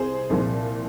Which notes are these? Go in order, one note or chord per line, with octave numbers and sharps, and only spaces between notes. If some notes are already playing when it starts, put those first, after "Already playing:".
Already playing: C2 C3 G#4 C5
C2 A#2 F3